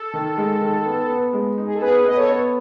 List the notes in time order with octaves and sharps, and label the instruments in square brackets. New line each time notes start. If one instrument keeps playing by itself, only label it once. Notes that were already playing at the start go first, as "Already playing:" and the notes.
Already playing: [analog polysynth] A4
[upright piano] D#3
G#3
D#3
B3
B3
G#3
D#4
[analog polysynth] G#4
A4
[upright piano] B3 [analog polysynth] G#4 B4
[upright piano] B3 [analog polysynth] D#5
[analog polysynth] A4 C#5
[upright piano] B3